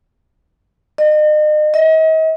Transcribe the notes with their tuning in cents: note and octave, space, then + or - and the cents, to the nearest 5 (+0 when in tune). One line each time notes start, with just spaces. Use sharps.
D#5 -40
D#5 +40